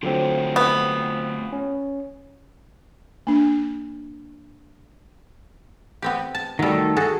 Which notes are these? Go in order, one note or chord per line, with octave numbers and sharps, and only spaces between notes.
D3 F#3 A3 C4 F4 G4
B3
C#4
A#3 D4
B3 C4 G4
A5
D#3 F#3 G3 A3 A4
F#4 G#4 A4